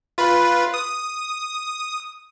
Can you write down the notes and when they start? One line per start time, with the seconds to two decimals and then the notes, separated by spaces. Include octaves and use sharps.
0.18 F4 B4
0.74 D#6